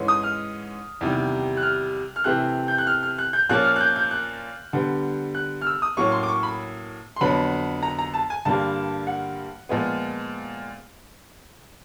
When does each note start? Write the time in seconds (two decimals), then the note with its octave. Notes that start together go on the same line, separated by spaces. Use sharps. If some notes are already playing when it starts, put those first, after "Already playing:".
Already playing: G#2 E3 G#3 C#4
0.08 D#6
0.23 F6
1.01 E2 C3 D#3 G3
1.57 F#6
1.62 F6
2.16 F6
2.24 C3 E3 A3 C4 F#6
2.68 G6
2.78 F#6
2.87 F6
3.03 F6
3.18 F#6
3.33 G6
3.49 A#2 F3 A#3 C#4 F#6
3.64 F6
3.76 F#6
3.81 G6
3.96 G6
4.11 F#6
4.73 D3 G3 B3
5.34 F#6
5.61 F6
5.67 E6
5.82 D#6
5.97 A2 F#3 A#3 C#4 C#6
6.12 C6
6.23 D6
6.28 C#6
6.43 B5
7.16 C6
7.21 F2 D3 F#3 B3 B5
7.83 A#5
7.99 A#5
8.14 A5
8.30 G#5
8.45 G2 D3 G3 A#3 A5
9.07 F#5
9.69 A#2 F3 G#3 B3